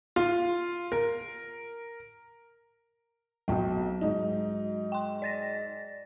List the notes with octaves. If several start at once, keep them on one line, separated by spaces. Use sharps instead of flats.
F4
A#4
B1 F#3 F#4 G5
G#2 D#4
G5 C6
D5 A6 A#6